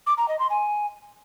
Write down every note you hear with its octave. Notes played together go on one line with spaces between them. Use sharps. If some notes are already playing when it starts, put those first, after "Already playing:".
D6
A#5
D#5
C6
G#5